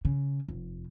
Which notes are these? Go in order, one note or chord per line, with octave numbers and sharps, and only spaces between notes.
C#3
F1